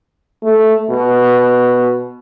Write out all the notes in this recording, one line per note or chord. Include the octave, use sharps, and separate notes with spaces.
A3
B2